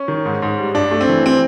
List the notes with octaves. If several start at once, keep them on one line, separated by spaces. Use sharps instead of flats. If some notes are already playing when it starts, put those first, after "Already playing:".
Already playing: C#4
D#3
G#2
G#2
G3
G2 D4
A3
C4
E3
C4